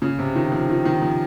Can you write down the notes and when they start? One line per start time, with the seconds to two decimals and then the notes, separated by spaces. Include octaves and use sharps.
0.02 C#3
0.19 C3
0.35 D#3
0.52 F3
0.69 D#3
0.85 D#3
1.02 F3